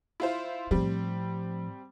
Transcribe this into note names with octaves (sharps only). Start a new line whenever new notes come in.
E4 F4 C5
A2 F3 G3 C4